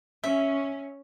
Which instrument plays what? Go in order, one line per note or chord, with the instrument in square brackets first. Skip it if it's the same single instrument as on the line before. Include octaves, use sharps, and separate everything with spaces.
[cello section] C#4 [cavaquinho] E5